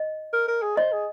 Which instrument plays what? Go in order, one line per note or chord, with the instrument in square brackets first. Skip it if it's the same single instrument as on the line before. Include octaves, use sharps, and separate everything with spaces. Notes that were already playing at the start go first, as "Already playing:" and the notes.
Already playing: [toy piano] D#5
[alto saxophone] A#4
A#4
G#4
[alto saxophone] C5 [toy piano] D#5
[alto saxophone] G#4